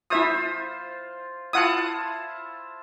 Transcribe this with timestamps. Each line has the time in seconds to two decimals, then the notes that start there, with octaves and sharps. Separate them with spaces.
0.10 E4 F4 C5 E5 D#6
1.53 E4 F4 F5 F#5 A5 D#6